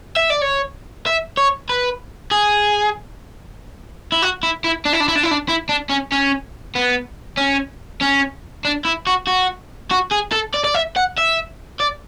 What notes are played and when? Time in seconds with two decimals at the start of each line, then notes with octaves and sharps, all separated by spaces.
0.17 E5
0.30 D5
0.42 C#5
1.06 E5
1.37 C#5
1.70 B4
2.32 G#4
4.12 E4
4.22 F#4
4.43 E4
4.64 E4
4.86 D4
4.93 E4
5.01 D4
5.08 E4
5.16 D4
5.23 E4
5.31 D4
5.49 E4
5.69 D4
5.90 C#4
6.12 C#4
6.75 B3
7.37 C#4
8.01 C#4
8.65 D4
8.85 E4
9.07 F#4
9.27 F#4
9.91 F#4
10.12 G#4
10.33 A4
10.54 D5
10.65 D5
10.75 E5
10.96 F#5
11.18 E5
11.80 D5